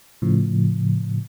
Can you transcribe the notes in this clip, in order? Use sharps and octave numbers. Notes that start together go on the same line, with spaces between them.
A2 C#3 F3